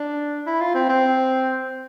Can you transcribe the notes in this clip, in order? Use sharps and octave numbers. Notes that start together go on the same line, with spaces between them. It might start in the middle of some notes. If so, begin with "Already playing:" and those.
Already playing: D4
E4
F4
C4
C4